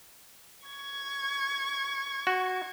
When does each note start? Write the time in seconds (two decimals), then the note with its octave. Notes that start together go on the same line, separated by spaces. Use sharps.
0.66 C#6 G#6
2.27 F#4